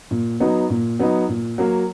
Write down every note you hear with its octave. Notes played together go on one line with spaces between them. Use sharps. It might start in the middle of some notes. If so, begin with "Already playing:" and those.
A#2
F#3 B3 D#4
A#2
F#3 B3 D#4
A#2
F#3 A#3